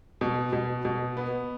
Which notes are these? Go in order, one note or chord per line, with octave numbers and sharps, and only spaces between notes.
B2
B2
B2
B3